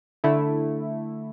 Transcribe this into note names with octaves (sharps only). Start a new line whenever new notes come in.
D3 A3 E4